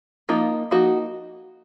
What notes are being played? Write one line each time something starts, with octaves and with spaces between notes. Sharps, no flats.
F3 A#3 D#4 F4
F3 A#3 D#4 F#4